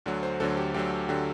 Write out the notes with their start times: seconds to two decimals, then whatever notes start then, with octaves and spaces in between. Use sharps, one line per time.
0.06 D2 D3 F#3
0.23 C5
0.40 D2 D3 F#3 A4
0.57 G4
0.74 D2 D3 F#3 G4
1.09 D3 F#3 G4